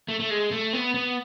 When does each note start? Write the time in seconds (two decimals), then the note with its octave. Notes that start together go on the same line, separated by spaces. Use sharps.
0.08 A3
0.20 A3
0.30 G#3
0.51 A3
0.73 B3
0.94 B3